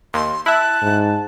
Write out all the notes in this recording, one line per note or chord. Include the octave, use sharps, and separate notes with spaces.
D#2 C6
E4 E5 A5 F#6
G#2